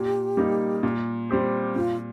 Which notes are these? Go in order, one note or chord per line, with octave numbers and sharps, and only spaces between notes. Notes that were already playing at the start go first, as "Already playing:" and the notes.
Already playing: A#2 G4
G3 A#3 D#4
A#2
G3 C4 G4 C5
A#2 F4